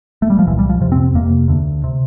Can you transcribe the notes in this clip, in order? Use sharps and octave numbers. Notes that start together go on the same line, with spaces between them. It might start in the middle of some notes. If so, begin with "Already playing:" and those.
A3
G3
F3
C2 A#2 E3
G3
F3
F2 C3 F3
C4
F2 C3 A#3
D2 D3
C3